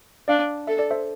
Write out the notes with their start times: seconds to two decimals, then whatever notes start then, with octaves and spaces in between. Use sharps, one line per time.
0.28 D4 D5 F5
0.67 A4 E5
0.79 D5
0.91 C5 E5